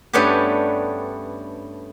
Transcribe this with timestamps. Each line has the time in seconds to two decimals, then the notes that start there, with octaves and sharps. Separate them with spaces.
0.13 G2 A3 B3 C#4 D4 G4